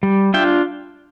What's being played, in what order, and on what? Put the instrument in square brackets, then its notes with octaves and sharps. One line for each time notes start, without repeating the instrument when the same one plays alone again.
[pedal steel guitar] G3
D4 F4 E5 G5